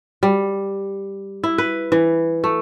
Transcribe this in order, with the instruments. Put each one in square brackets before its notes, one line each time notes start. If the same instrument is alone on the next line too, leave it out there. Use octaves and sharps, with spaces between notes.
[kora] G3
E4
B4
E3
A3